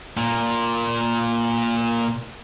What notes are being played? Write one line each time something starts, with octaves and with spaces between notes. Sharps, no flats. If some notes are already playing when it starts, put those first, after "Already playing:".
A#2 A#3